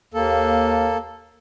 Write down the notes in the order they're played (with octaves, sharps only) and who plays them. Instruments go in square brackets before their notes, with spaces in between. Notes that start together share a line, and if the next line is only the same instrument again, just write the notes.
[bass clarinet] D#2 [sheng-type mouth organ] A#3 A4